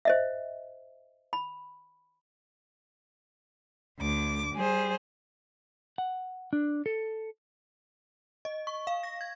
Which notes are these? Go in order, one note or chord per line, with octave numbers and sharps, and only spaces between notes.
C5 D#5 E5
B5
D2 D6
G3 G#4 C5
F#5
D4
A4
D#5
C#6
F5
A#6
G#6